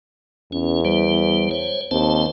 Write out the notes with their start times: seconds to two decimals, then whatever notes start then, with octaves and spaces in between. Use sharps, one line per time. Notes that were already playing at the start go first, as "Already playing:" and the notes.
0.53 E2 C#4
0.85 G3 C5
1.51 C5 C#5
1.91 D#2 C4 C5 A5